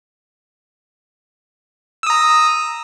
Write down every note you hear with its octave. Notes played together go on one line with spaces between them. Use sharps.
A#5 D#6 E6